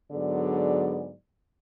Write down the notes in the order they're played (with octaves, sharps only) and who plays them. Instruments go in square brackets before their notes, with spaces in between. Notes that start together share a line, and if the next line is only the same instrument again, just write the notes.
[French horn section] G#2 D3 F#3 B3 G#4 D5